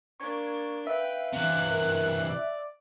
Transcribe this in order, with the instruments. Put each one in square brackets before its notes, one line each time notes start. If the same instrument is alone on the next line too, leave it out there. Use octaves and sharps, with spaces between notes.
[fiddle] A#3 D4 [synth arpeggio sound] C#6 G#6
[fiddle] B4 G5 [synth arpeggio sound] E5 [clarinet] F5
[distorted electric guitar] C3 E3 [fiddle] F#6
[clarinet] A#4
D5